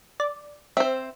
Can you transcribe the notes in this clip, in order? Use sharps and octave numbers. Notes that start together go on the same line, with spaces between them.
D5
C4 C5 E5